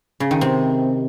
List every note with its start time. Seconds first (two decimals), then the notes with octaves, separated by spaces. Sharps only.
0.20 C#3
0.31 D#3
0.41 C3